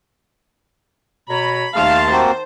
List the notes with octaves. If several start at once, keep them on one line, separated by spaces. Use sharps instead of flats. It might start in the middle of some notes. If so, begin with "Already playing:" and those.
B2 C#5 A#5 B5
D#2 D#3 A3 F5 A5 C6
A#3 C4 F#4 C5